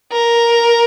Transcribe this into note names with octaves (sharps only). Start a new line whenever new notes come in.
A#4